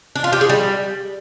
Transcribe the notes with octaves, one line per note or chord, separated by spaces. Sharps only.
D4
F4
G4
G#4
G3